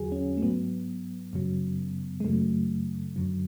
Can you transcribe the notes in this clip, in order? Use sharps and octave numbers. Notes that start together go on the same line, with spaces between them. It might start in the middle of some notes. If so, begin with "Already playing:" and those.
Already playing: E2 D3 F#3 F#4 G#4
C#4
A3
G#2 F#3 B3
F#2 C#3 F#3
G#3
F#2 C#3 F#3 A3
F#2 D3 F#3